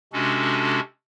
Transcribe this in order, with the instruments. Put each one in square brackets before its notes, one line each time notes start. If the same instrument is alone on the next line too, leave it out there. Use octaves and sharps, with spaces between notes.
[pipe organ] C3 G#3 C#4 D4 F#4 A4